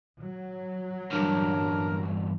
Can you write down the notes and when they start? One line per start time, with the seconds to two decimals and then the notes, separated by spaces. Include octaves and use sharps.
0.22 F#3
1.12 E2 G2 D4 A#4